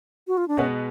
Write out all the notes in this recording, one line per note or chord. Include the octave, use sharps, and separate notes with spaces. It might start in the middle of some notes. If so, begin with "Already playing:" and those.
F#4
F4
D4
B2 G#3 B3 C#4 F#4 B4